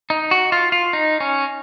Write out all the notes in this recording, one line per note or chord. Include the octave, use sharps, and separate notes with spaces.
D#4
F#4
F4
F4
D#4
C#4